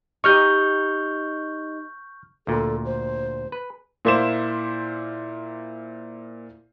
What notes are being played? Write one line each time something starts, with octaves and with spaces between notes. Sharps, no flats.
D#4 G4 D#5 C#6 F6 G6
D2 A#2 A4
C5
B4
A#2 A#3 E4 C5 E7